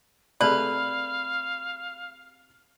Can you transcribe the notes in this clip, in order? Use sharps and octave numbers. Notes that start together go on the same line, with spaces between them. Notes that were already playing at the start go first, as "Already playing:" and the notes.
C3 A3 G#4 B4 D5 F5